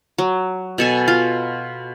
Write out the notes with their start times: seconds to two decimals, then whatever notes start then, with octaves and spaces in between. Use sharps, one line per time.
0.18 F#3
0.78 B2 A4 G#5
1.08 F4